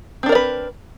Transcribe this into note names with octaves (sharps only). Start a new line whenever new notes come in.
C4 D4 A#4 B4 D5